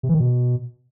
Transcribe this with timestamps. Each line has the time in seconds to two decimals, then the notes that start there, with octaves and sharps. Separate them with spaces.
0.03 C3
0.09 E3
0.14 D#3
0.20 B2